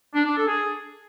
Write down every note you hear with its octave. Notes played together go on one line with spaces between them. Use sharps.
D4
D4
A4
G#4